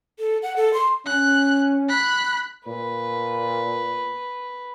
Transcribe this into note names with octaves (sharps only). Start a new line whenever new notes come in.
A4
F#5
A4
C6
C#4 F#6
B5 F#6
A#2 B4